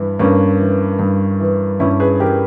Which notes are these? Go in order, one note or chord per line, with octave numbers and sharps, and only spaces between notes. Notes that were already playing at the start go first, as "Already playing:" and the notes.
Already playing: G2 E3
G2 A#3 C#4
E3
G2
E3
G2 C#4 E4
G#4 B4
E3 G4 A#4